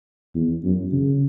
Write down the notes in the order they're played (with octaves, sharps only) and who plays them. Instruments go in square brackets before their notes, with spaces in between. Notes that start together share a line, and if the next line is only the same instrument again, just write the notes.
[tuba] E2
F#2
C#3